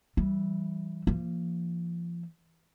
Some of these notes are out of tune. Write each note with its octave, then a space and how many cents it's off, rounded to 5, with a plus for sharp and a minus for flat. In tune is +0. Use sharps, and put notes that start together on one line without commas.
E3 +0 G3 -25
F3 -30 A#3 +0